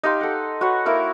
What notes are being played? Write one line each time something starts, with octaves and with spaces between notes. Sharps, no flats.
D#4 G4 F5 C6
A4 F#5
F#4 B4 C#5 F#5
A#3 E4 A#4